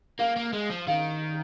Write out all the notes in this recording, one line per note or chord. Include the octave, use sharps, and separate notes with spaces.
A#3 F5
A#3
G#3
F3
D#3 F5